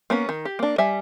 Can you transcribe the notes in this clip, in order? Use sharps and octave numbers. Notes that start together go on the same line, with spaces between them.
A#3 B3 C#4
D#3
G4
A#3 D4
G3 E5 G#5